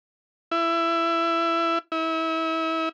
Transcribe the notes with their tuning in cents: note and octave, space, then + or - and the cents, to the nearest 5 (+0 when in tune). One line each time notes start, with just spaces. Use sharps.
E4 +20
E4 -30